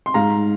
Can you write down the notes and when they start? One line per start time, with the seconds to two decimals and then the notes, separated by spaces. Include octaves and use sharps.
0.06 C6
0.14 G#2 F5 A#5